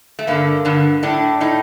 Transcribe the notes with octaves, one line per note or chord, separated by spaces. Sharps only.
A3
G2 D3 A#3
G2 D3
A2 D4
A2 D#4